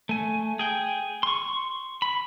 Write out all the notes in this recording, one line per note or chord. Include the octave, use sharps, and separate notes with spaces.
A3 G#5
G#4 G5
C6 C#6
B5